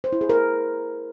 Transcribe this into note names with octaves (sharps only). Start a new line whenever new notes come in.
C5
E4
G#4
A#4